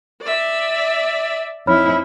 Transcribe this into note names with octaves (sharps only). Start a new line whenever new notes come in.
D5 E5
F2 D#4 E4 C#5 B5 F6